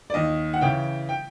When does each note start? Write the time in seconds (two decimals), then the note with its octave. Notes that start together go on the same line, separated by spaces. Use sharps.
0.10 D5
0.14 D#2 D#5
0.54 F#5
0.61 C#3 E3 G5
1.09 G5